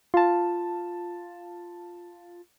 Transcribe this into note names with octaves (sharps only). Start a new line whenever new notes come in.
F4 A5